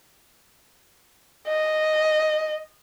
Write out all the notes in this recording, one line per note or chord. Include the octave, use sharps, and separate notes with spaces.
D#5